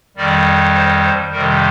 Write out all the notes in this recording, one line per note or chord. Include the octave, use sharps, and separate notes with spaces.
F2 D#3 G3 D5
C5
C5
F2 C3 D#3 G3 A#4